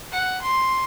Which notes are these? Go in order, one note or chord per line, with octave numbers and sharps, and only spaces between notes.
F#5
C6